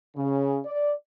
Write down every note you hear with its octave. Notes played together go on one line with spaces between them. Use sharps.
C#3
D5